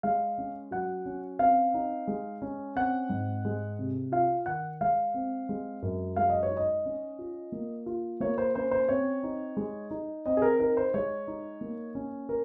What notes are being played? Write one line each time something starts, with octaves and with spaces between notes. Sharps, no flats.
G#3 F5
C#4
F#3 F#5
C#4
C4 F5
D#4
G#3
C#4
C4 F#5
G#2
G#3
C3
F4 F5
D#3 F#5
G#3 F5
C4
G#3
F#2
G#3 F5
D#5
C#5
D#4
D#5
C#4
F4
A#3
F4
A#3 C#5
C5
C#4 C5
C5
C4 C#5
D#4
G#3
D#4
C4 D#5
G#4
A#4
D#4 A#4
C5
G#3 C#5
D#4
A#3
C#4
A#4